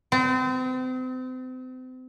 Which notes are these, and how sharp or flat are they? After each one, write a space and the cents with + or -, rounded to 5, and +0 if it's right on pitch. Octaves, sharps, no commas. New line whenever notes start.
C4 -35